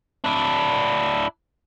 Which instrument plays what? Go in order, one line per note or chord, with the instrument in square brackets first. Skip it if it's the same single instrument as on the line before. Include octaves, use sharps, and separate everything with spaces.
[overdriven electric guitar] D4 E4